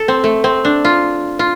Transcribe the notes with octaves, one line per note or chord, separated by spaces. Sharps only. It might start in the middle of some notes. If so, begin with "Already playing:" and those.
Already playing: A4
C4
A3
C4
D4
F4
F4